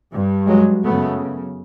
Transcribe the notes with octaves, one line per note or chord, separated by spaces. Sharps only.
G2
F#3 G#3
F#2 C#3 A3 B3